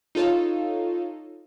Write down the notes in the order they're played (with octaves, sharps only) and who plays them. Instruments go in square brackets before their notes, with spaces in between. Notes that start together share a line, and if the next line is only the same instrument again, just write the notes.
[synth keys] D#4 F4 A4 C#5 F5